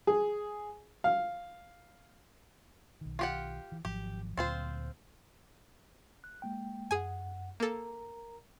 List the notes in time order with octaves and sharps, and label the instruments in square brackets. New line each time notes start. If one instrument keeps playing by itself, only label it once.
[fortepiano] G#4
F5
[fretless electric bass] B1 D#3
[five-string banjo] F4 G4 F#5
[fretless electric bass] E3
[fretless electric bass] G#1 F3 F#3 [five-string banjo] G4
[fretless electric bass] D2 A#2 F#3 [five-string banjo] C4 F4 C5
[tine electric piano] F#6
G#3 A#3 G5
[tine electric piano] F#2 F#5 [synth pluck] G#4 G#5
[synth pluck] A#3 A4 [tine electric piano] A#4 A#5